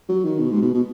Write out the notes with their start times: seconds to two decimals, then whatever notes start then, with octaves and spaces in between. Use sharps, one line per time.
0.09 F#3
0.24 D#3
0.39 B2
0.51 G#2
0.62 B2
0.74 B2